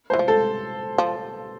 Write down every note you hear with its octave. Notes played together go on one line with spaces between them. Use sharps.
C5
E3
F3
A4
F3